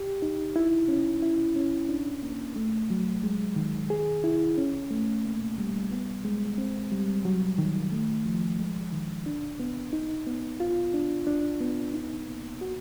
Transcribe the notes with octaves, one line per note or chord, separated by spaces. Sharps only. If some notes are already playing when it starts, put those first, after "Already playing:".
Already playing: G4
D#4
E4
C#4
E4
C#4
D4
A#3
A3
F#3
G#3
D#3
G#4
E4
C#4
A3
A#3
G3
B3
G#3
C4
G3
F#3
D#3
A3
F3
G#3
D#3
D4
B3
D#4
B3
F4
D4
D4
B3
D#4
A#3
F#4